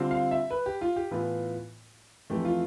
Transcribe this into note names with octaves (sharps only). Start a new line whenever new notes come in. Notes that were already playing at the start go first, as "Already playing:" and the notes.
Already playing: D3 G3 C4 F4
F5
E5
B4
G4
F4
G4
A2 E3 B3 F4
F2 E3 A3 G4
F4